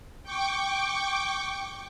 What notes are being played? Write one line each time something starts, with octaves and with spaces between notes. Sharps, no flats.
G5 C#6 D6